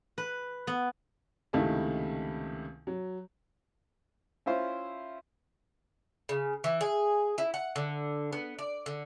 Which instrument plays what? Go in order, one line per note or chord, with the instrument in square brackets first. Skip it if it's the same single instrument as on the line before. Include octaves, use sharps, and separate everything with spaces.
[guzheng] B4
B3
[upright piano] C#2 C3 D#3 A3 E4 A5
F#3
[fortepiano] C#4 E4 F4 C5
[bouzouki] C#3
E3
G#4
E4
F#5
D3
B3
D5
D3